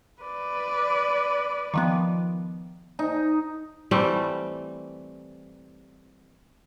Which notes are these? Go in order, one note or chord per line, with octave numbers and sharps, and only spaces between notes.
B4 D5
D#3 F3 B3
D#4
E3 G3 A3 C4